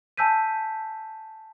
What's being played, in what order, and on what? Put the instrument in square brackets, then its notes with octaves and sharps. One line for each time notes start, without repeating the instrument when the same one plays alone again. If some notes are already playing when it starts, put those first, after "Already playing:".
[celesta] G#5 A5 E6 G6 B6 D#7